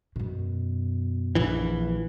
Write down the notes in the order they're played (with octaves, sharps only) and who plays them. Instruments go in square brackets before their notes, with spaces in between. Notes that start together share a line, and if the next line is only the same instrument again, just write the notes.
[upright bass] F#2 B2
[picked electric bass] A#1 E3